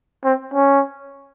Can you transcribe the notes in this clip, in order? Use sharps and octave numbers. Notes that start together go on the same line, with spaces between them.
C4
C#4